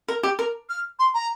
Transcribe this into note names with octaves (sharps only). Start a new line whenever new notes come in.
A#4
G4
A#4
F6
C6
A#5